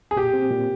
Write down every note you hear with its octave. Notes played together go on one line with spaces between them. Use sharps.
G#4
A#2 G4
C4
A#2